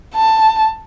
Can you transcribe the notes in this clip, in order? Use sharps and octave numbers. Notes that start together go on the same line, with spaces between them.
A5